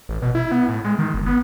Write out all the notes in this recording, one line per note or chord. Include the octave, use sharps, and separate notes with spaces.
A1
B2
E4
B3
A2
G#3
D#3
G1
B3